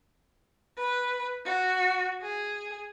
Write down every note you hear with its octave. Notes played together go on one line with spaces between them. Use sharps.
B4
F#4
G#4